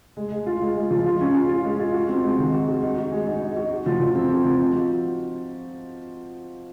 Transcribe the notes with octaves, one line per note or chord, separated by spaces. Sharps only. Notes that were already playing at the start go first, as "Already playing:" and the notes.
G#3
G#3
F4
G#3
G#3
F3
F4
C#4
F4
F4
G#3
F4
F#4
C4
G#3
D#3
F#4
G#3
D#4
F#4
G#3
D#4
D#4
F#4
F#4
F3
F3
C4
C4
F3
D#4
F#4